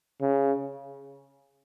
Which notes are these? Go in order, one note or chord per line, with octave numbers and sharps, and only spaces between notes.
C#3